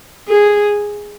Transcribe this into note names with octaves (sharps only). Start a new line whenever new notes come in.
G#4